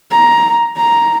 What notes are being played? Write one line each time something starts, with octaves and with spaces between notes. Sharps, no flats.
A#5
A#5